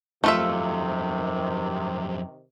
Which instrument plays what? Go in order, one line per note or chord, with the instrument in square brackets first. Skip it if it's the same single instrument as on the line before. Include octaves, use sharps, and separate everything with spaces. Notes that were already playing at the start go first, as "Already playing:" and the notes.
[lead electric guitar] F2 F#3 [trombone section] C3 D#3 [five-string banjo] A3 F4 E5